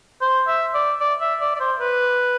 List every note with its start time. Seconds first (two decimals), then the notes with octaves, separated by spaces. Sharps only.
0.21 C5
0.48 E5
0.74 D5
1.00 D5
1.21 E5
1.41 D5
1.56 D5
1.60 C5
1.80 B4